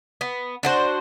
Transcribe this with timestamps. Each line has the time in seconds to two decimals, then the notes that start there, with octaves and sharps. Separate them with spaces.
0.21 B3
0.63 D4 F#4 C5